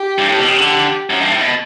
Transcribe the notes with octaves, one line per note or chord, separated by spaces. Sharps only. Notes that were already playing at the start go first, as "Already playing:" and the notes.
Already playing: G4
G2
A2
B2
C#3
D3
F#2
G2
A2
B2